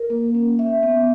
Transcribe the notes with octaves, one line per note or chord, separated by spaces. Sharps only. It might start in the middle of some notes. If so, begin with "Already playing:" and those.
Already playing: A#4
A#3
C#4
E5
B3